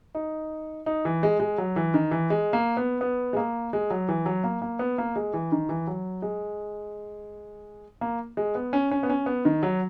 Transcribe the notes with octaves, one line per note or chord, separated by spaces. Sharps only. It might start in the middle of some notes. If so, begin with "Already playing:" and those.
D#4
D#4
E3
G#3
G#3
F#3
E3
D#3
E3
G#3
A#3
B3
B3
G#3
A#3
G#3
F#3
E3
F#3
A#3
A#3
B3
A#3
G#3
E3
D#3
E3
F#3
G#3
A#3
G#3
B3
C#4
C#4
B3
C#4
B3
D#3
F#3